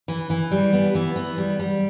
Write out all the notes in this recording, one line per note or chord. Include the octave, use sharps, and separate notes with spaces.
E3
E3
G3
B3
E3
B3
G3
G3